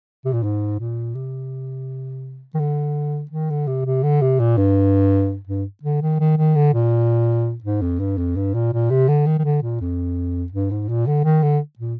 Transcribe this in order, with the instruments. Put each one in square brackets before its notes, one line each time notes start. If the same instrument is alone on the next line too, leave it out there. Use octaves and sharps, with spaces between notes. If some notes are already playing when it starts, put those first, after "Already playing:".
[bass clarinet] C3
A#2
G#2
A#2
C3
D#3
D3
D#3
D3
C3
C3
D3
C3
A#2
G2
G2
D3
D#3
D#3
D#3
D3
A#2
G#2
F2
G2
F2
G2
A#2
A#2
C3
D3
D#3
D#3
D3
A#2
F2
G2
G#2
A#2
D3
D#3
D3
A#2